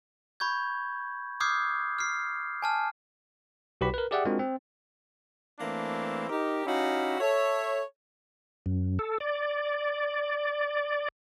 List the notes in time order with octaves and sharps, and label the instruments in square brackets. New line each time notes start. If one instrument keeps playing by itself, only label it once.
[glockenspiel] B5 C#6 G6 G#6
D6 D#6 F6 G6 G#6 C7
F6 C7
G#5 A5 F6
[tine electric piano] B1 F#4 G4 B4 B5 B6
A#4 B4
G4 G#4 D5 E5 F#5 G5
G#3 C4 D4 F4 F#4 A#4
C4
[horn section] E3 A3 A#3 C4 D4 E4
D#4 G4 A#4
C#4 D#4 E4 F#4 G4 F5
A4 C#5 E5
[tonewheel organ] F#2
A4
D5